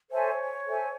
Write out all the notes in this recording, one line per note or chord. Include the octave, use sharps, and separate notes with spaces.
A4 C5 C#5 E5 G#5
A4 C5 E5 G#5